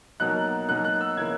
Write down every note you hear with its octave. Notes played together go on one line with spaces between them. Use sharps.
B2 F#3 A#3 D#4 F#6
B2 F#3 A#3 D#4 F#6
F#6
E6
C#3 E3 A#3 E4 G#6